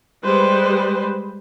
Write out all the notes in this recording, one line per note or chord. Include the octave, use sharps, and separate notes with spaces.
G3 G#3 B4 C5